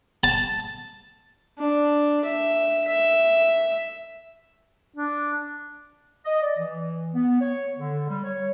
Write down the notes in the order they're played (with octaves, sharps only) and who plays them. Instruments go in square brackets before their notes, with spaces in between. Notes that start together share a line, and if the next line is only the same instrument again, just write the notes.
[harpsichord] A5
[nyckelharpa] D4
E5
E5
[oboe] D4
[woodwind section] D#5
D5
E3
B3
C#5
D3
G3
C#5